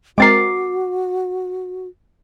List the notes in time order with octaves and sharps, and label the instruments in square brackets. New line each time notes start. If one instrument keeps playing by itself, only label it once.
[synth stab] G#3 C4 A#4 [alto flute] F#4 [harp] D6 A6 C7